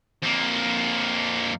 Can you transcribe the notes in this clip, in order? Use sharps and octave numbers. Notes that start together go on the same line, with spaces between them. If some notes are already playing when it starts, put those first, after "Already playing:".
F2 A#3